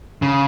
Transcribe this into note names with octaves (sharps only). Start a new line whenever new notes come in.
C#3